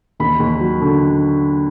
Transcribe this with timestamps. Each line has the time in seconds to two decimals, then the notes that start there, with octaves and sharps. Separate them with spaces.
0.20 D#2 B5
0.39 D#2
0.61 F#3
0.81 D3